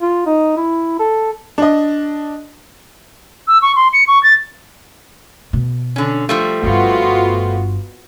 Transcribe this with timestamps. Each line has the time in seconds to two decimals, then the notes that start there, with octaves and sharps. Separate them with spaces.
0.01 F4
0.26 D#4
0.57 E4
0.99 A4
1.58 D4 D#5
3.48 E6
3.62 C#6
3.76 C6
3.93 C#7
4.08 C#6
4.23 A6
5.53 B2
5.96 D3 C#4
6.29 F3 G3 A3
6.63 G1 G2 B3 F4 F#4